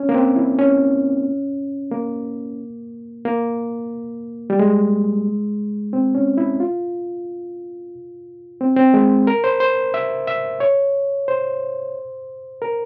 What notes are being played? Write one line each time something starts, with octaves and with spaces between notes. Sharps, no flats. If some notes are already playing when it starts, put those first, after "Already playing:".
Already playing: C#4
A#3
C4
E4
C#4
A#3
A#3
G3
G#3
C4
C#4
E4
F4
C4
C4
G#3
A#4
C5
C5
E5
E5
C#5
C5
A#4